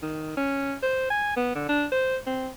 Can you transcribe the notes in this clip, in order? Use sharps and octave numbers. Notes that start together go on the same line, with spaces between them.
D#3
C#4
C5
G#5
B3
D3
D4
C5
C4